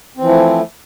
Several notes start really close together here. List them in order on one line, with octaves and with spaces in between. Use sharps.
C4 E3 F3 E4 A3